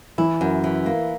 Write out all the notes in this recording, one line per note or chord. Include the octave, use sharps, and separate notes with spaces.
E3 E4
F#2
E3
A#3